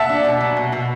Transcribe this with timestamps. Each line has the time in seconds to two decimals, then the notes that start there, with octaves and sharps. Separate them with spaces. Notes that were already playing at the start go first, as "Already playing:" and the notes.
Already playing: E5 F#5 A5
0.09 D4
0.25 B2
0.40 F#3
0.57 B2
0.72 B2